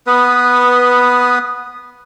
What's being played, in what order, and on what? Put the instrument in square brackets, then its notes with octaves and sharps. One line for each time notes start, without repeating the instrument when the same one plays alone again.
[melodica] B3 B4 D#6